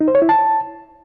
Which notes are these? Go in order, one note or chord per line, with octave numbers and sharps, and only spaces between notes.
D#4
C5
C#5
E4
A5